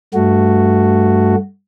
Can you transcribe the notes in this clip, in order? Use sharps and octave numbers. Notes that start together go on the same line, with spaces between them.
G2 A3 F#4